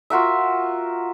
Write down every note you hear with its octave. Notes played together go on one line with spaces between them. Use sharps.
F4 F#4 A#4 E5